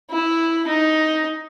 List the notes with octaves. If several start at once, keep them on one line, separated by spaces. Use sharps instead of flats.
E4
D#4